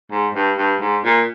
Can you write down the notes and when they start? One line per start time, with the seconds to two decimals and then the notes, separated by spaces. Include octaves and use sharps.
0.11 G#2
0.35 G2
0.58 G2
0.81 G#2
1.05 A#2